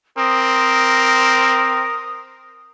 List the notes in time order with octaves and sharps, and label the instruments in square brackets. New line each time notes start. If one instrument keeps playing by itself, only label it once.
[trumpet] C4 [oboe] A#4 [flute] D#6